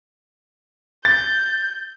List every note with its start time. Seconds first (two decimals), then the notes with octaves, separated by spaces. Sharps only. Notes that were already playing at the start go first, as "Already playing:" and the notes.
1.05 G6 A6